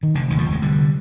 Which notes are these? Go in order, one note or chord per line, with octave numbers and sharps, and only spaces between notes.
D#3
F1 D3
D#2 D#3
F3
F1
G#3
D3 G3